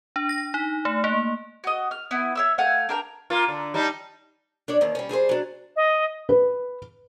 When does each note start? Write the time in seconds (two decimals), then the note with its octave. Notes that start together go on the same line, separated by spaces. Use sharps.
0.16 D4
0.29 A#6
0.54 D#4
0.85 A3
1.04 A#3
1.64 F#4 D#5
1.91 F6
2.11 B3 E4
2.35 C#5 E5 E6
2.58 A3 F5 F#5 G#5
2.89 D4 A#4 G5
3.30 A#3 F4
3.48 D3
3.74 G3 D4 D#4
4.68 D4 C#5 D5
4.81 D#2 D#3 E3
4.95 G3 C#4
5.09 G3 G#4 A4 C5
5.29 F#3 D4
5.76 D#5
6.29 B4